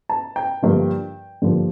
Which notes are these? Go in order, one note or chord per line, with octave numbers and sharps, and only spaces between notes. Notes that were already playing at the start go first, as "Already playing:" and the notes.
A5
G5
G2 D3 F3 A#3
G2 D3 F3 A#3